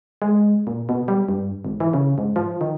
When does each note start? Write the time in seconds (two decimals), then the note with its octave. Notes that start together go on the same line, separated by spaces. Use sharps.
0.22 G#3
0.67 A#2
0.89 B2
1.08 G3
1.29 G2
1.65 G#1
1.80 E3
1.94 C#3
2.18 G#2
2.36 F3
2.61 D#3